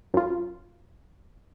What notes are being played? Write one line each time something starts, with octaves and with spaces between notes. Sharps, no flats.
F#2 F4